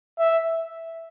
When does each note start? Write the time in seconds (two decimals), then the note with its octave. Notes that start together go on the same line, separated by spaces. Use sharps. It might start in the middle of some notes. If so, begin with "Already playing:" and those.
0.19 E5